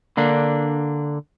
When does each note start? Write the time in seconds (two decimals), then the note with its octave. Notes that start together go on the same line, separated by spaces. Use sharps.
0.17 D3 A#3 D4